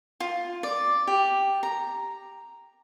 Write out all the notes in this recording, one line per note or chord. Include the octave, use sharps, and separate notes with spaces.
F4
D5
G4
A#5